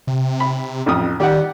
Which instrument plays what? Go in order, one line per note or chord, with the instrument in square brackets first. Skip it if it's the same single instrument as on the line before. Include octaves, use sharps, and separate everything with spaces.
[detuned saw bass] C3
[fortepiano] B5
A1 F2 D#6
[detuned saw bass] D#3 [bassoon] G3 [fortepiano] G4 D5 F#5